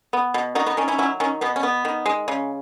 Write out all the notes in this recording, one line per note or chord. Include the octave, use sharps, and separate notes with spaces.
B3
B2
D#3 D#4 F#4
B3 D#4
D#3 C#4
C#4 E4
F#3 C#4 E4
D#3 C#4
B2 B3
C#4
B3
D#3
G#3
C#3